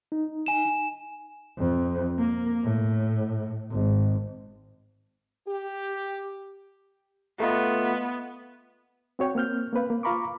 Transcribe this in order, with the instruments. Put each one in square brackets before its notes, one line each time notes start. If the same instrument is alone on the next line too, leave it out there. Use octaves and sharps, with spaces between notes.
[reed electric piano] D#4
[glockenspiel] G#5 E7
[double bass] F2
A#3
A2
G#1
[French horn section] G4
[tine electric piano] A3 F4 D#5 [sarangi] B3
[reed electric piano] C4 F#4 C#5 G5
A#3 C4 F6 G6
A#3 C4 B4 F5
A#3
F4 F5 A#5 B5 C#6 D6